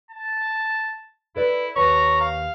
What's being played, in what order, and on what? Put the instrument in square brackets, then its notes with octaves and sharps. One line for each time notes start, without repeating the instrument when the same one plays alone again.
[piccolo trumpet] A5
[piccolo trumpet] E4 [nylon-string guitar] A4 B4 D5
[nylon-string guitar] D#2 B4 A5 [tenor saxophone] C#5 [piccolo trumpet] A#5
[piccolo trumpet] F5